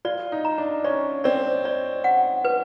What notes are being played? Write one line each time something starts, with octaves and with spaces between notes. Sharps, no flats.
F4 D5
D#4
A#5
D4
C#4 D5
C4 D5
D5
F#5
B4